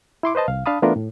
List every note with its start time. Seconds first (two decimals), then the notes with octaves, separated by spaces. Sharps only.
0.23 E4 C6 D6
0.35 B4 C5 D#5 A5
0.48 C2 F5
0.66 D4 F5 A5 B5 D#6
0.82 E3 A3 B3 D4 F4 A#4
0.96 A2